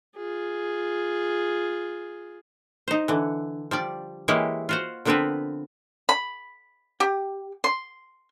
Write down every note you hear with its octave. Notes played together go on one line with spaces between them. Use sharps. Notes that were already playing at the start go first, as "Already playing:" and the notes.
F4 G#4
D#4 C5
D3 E3
F3 G3 D5
E3 G#3 A#3 E4 G4 C#5
F4 F#4 C5
D3 F3 B3 C4 A#4 B4
B5
G4
C6